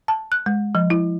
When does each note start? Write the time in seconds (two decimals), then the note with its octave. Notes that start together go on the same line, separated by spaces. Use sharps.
0.08 A5
0.32 F#6
0.46 G#3
0.75 F3
0.90 E4